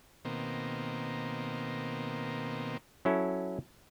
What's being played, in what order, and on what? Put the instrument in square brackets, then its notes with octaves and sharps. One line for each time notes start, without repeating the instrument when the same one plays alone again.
[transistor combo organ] B2 D#3 A#3 C4
[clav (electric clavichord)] F#3 C#4 E4 A4